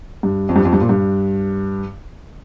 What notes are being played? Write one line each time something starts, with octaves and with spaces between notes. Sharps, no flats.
G2
F2
G2
F2
G2
A#2
G2